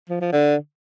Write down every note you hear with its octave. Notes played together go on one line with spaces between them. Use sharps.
F3
F3
D3